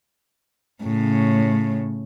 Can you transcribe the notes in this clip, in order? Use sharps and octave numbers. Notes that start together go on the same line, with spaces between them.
A2 C#3